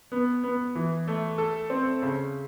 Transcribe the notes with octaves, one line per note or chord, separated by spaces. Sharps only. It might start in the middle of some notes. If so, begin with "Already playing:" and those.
B3
B3
E3
A3
A4
C4
C#3